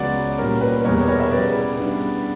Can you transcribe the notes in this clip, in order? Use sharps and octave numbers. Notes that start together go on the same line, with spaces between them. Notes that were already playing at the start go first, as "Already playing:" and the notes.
Already playing: C#2 C#3 F#3 B3 D5 F#5
A#2 G3 C#4 A#4
B4
E2 B2 G3 B3 A#4 C#5
A#4 C#5
E5
C#3 G3 B3 E4 B4 D5
C#3 G3 B3 D4